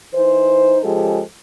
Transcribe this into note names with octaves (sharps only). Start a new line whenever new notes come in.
E3 D#4 C5
C#3 F3 G#3 G4 A4